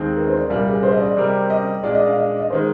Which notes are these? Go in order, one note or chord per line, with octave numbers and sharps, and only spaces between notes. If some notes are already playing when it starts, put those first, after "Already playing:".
Already playing: D#2 D#3 G#3 C4
A#4
C5
D5
C2 A#2 G3 A#4
G#4
C5
D#5
D5
C3 G3 C4 G4 A#4
D#5
A#2 G#3 D4 D5
D#5
F5
D#5
D#5
D#3 G#3 C5